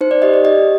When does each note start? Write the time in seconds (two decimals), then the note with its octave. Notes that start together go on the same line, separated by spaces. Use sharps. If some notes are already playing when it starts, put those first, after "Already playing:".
0.01 D#4 C5
0.11 D5
0.22 G4 D#5
0.34 D5
0.44 G4 D#5